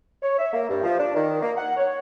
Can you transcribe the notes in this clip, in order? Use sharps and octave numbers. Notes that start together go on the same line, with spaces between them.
C#5
E5
A#3
G2
F3
D4
D#3
A#3
F#5
C#5